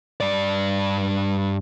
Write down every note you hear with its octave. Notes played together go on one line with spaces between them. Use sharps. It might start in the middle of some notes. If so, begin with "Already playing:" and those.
G2 D5